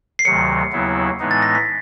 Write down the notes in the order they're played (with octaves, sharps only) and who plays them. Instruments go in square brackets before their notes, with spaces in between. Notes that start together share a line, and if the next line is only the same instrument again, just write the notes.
[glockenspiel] C7
[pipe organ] D2 C3 D#3 F#3 [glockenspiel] C#7
[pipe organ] D#2 C#3 F#3 B3 E4
A2 E3 G#3 B3 D#4
[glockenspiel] A6
A#6
B6